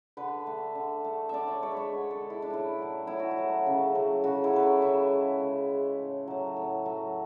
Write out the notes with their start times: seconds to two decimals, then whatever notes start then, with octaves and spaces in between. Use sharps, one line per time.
0.17 D3 B4
0.47 A3
0.75 D3
1.05 A3
1.29 D3 D5 E5
1.48 C#5
1.62 G#3 C#5
1.71 B4
1.77 C#5
1.92 D3
2.11 A4
2.21 G#3
2.30 E4
2.42 D4
2.50 A2 E4
2.79 F#3 A3
3.07 A2 E4
3.19 F#4
3.31 E4
3.37 F#3 A3
3.66 C#3
3.95 F#3 A3
4.24 C#3 F#4
4.44 E4
4.53 F#3 A3 B4
4.63 C#5
4.82 C#3 E5
5.11 G#3
5.40 C#3
5.70 G#3
5.99 A2
6.27 F#3 A3
6.57 A2
6.85 F#3 A3